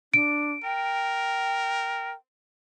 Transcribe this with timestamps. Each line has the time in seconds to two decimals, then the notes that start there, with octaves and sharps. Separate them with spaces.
0.14 D4 D7
0.64 A#4 G5